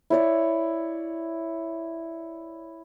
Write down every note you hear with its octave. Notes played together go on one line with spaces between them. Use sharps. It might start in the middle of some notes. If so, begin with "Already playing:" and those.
E4 C#5 D5